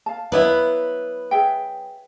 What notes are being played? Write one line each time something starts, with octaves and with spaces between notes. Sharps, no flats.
F5 A5
F#3 B3 E4 B4
G#4 E5 G5